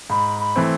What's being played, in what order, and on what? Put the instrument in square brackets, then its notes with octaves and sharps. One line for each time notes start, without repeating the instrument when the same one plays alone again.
[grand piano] G#2 [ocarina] B5
[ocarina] B5
[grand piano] E3 A3 C4